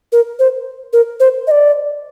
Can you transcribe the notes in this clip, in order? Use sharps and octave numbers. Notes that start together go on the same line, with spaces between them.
A#4
C5
A#4
C5
D#5
D5